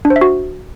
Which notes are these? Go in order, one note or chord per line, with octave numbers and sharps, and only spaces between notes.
D4
C5
E5
F#4